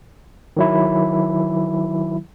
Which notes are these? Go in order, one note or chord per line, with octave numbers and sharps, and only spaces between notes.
D#3 F#3 E4